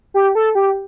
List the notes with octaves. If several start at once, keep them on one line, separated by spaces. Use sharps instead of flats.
G4
A4
G4